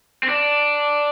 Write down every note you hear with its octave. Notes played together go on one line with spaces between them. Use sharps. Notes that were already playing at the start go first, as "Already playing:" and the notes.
C4
D4